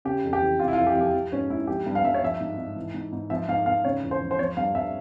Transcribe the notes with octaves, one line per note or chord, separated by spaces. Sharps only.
C#3 G4
F2
G4
E3
C3 F4
E4
F4
F2
G4
F3
G4
F3
G#2 C#4
G#2 E4
F3 G4
G2
F5
G2 E5
C#5
F3 E5
G#2
G#2
E3
G#2
G#2
F3 E5
G#2 F5
G#2 F5
C#3 C#5
E2
C5
F3
C5
F3 C#5
G2 F5
G2 E5